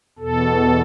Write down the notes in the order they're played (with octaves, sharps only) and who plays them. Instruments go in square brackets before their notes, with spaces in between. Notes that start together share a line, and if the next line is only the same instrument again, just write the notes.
[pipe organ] E2 B2 A4